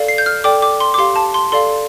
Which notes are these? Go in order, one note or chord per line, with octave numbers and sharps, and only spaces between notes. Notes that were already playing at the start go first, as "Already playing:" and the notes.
Already playing: A4 D5 F5
C7
G6
F6
A4 D5 G5 D6
D6
C6
D6
G4 F5 C6
A5
C6
A4 D5 F5 C6